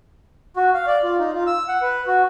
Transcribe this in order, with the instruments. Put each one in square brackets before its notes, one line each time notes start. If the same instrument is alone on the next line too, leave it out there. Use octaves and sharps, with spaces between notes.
[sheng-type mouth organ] F#4
F5
D5
F4
D#4
F4
E6
F#5
B4
F#4